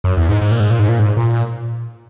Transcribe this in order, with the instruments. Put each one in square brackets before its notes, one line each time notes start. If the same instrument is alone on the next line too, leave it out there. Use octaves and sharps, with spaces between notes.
[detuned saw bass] F#2
E2
G#2
G#2
A#2
G#2
A#2
G#2
A#2
G#2
A#2